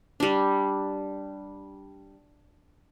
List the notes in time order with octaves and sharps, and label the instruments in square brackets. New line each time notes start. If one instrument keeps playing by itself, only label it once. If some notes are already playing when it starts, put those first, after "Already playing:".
[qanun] G3 D4